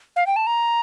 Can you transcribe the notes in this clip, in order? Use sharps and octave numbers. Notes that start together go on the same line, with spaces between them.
F5
G5
A5
A#5